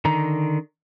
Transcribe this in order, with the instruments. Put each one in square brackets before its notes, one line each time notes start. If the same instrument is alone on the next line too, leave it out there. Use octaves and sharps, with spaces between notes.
[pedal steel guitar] D3 D#3 A#5